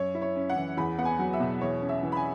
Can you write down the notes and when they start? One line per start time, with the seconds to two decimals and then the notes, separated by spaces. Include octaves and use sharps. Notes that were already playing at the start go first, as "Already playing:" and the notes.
Already playing: F#2 C#5
0.15 E4
0.22 C#5
0.36 C#4
0.50 F#5
0.56 E3
0.77 E2 B5
0.98 B3 F#5
1.05 G#5
1.19 F#3
1.33 E5
1.40 B2
1.61 E2 C#5
1.81 C#4
1.89 E5
2.03 E3
2.12 B5
2.17 G#5